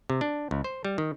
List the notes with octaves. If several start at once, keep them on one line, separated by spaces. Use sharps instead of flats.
C3
D4
C#2
C5
G3
D#3